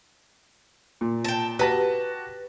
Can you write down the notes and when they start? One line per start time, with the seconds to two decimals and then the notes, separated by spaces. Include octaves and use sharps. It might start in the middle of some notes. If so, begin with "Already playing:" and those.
1.01 A#2
1.24 G5 A5
1.59 F#4 G4 B4 A5 A#6